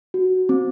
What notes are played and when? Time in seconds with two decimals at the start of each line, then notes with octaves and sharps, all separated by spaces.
0.14 F#4
0.49 C4